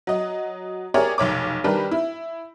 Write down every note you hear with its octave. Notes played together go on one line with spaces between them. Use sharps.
F#3 D#5
G4 G#4 A#4 C#5 D5
F1 B1 C#5 D6
D#3 G3 D4 G4 A#4 B4
E4